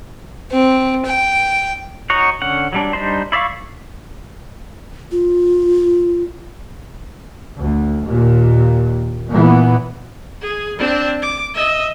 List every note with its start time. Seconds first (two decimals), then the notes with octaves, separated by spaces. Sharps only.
0.51 C4
1.06 G5
2.10 D#4 F#4 C#5 F#5
2.42 D3 C#4 F#5
2.73 F#3 G3 D4
2.93 G3 D4 D#4 C5
3.32 E4 D5 E5 F5 C#6
5.12 F4
7.56 D2
8.05 D#2 A#2
9.29 A#2 E3 B3
10.41 G#4
10.78 C4 D4
11.22 D6
11.54 D#5 E5